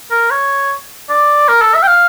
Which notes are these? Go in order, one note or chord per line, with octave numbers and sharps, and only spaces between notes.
A#4
C#5
D5
A#4
A4
E5
G5
F5